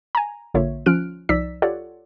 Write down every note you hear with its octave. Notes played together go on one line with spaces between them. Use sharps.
G#5 A#5
A#1 D3 A#3 F4 C#5 E5
F3 C#4 F4 F6 F#6 D7
C2 F3 D#4 D5 E6 B6
F4 G4 A4 C#5 D5 F#5